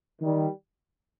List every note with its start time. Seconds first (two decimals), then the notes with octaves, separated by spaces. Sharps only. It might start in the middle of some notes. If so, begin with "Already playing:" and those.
0.22 D#3 G3